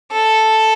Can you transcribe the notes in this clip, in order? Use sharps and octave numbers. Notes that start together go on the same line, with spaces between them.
A4